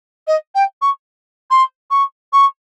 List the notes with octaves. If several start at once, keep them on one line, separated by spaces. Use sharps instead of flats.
D#5
G5
C#6
C6
C#6
C#6